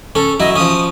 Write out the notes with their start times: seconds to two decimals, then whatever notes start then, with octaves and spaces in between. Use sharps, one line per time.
0.15 C#4 A4
0.40 F#3 E4 D#5
0.56 F3 C#4 D#6